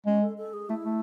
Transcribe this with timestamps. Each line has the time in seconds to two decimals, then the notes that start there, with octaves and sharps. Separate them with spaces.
0.06 G#3 C#4
0.22 A4
0.38 A4
0.53 G#4
0.69 A3 E4
0.85 A3